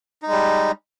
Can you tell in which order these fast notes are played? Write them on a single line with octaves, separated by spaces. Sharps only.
D#4 G#3 G3